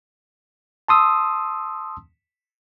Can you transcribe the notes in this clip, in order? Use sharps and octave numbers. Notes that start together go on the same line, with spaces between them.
A5 C6 D#6 E6